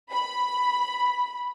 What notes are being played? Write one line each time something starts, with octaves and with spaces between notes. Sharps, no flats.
B5